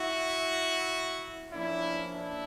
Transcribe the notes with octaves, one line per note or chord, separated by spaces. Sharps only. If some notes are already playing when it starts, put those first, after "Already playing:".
Already playing: E4 F#4
F3 A#3 C#4 D4 E4
D4 E4